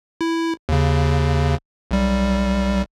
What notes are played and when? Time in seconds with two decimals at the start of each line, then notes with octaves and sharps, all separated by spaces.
0.21 E4
0.69 D#2 C#3
1.91 B1 G3